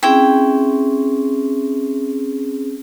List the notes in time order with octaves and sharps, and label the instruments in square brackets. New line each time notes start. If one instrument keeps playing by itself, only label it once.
[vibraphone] C4 C#4 G#4 [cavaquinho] E4 G5